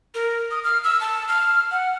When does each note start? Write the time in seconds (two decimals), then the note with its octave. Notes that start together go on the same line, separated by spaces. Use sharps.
0.15 A#4
0.51 D#6
0.64 F6
0.84 E6
1.01 A5
1.28 F6
1.71 F#5